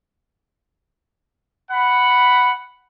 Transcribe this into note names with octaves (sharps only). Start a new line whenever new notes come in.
F#5 B5